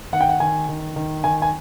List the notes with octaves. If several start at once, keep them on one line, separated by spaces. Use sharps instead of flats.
D#3 F#5
G5
F#5
D#3 G#5
D#3
D#3
D#3 G#5
G#5